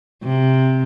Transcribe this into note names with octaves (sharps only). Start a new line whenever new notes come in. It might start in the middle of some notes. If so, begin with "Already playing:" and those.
C3